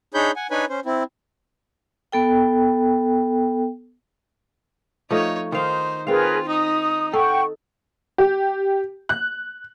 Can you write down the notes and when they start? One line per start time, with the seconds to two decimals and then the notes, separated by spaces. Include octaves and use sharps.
0.14 D4 D#4 G#4 C#5 B5 G6
0.36 F#5 G#5
0.51 D4 D#4 B4 C#5 G#5 B5
0.69 C#4 C5
0.86 C4 E4
2.12 B3 A4 G5
5.10 F3 A3 D#4 C#5 D#5
5.52 D#3 D#4 C5 F5
6.07 C4 F4 G#4 A#4 B4 F5
6.48 D#4 D#6
7.13 A4 F#5 G5 C#6
8.18 G4
9.09 F#6